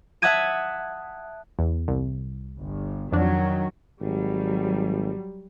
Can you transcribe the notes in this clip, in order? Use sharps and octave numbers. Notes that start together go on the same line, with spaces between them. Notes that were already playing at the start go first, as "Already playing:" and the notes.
E5 F#5 A5 D#6 G#6 D#7
E2
C2
G1
F2 D#3 F#3 D4
G#1 F#3 G3